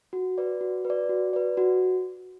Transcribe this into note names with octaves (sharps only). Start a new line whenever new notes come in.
F#4
B4 D5
F#4
B4
D5
F#4
B4 D5
F#4